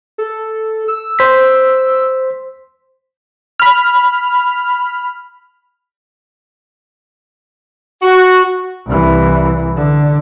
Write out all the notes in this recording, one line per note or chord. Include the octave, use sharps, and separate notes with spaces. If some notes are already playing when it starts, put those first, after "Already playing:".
A4
E6
C5 B6
B5 F6
F#4
C2 E3
D3